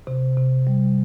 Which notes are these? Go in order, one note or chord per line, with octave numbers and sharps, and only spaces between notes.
C3
C3
G3